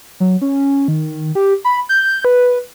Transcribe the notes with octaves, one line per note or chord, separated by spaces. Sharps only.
F#3
C#4
D#3
G4
B5
G6
B4